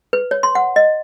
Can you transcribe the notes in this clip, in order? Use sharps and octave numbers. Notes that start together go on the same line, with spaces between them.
B4
C#5
C6
F#5
D#5